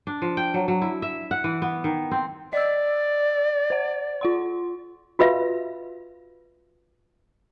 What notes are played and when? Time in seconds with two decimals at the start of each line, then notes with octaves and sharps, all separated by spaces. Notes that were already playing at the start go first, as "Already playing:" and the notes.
0.07 D4
0.22 F3
0.37 G5
0.54 F#3
0.68 F#3
0.82 E4
1.02 E5
1.31 F#5
1.44 E3
1.62 B3
1.84 D#3
2.11 C4
2.53 D5 D#5 E6
3.70 C5 F#5
4.21 F4 F#5 C6
5.19 F4 F#4 B4 E5 F5